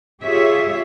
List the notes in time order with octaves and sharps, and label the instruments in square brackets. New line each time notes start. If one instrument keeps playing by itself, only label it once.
[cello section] F4 G4 G#4 C#5 E5